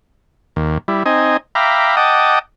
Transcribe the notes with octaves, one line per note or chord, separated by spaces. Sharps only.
D#2
G3 E4
C4 D#4 D#5 G#5
E5 F5 G5 A#5 B5 D6
D#5 F#5 G5 A5 D6 D#6